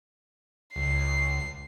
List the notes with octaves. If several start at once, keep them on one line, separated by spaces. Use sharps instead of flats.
C#2 C7